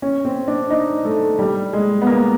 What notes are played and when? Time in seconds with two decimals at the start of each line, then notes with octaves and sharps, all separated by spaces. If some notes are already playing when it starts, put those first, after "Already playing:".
0.02 C#4
0.25 C4
0.48 D4
0.70 D#4
1.05 A3
1.39 G3
1.73 G#3
2.02 B3
2.07 A#3